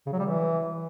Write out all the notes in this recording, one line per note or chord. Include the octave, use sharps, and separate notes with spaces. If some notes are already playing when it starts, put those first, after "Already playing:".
C#3
F#3
G3
E3